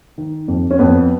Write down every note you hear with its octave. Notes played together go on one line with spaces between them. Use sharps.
D#3
F2
C#4
F2 B3